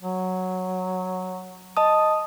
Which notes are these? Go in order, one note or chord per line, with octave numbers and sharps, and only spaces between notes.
F#3
D#5 A5 D#6